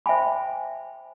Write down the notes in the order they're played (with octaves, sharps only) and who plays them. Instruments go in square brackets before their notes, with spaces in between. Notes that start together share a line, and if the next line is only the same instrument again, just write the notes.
[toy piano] C5 E5 G5 G#5 B5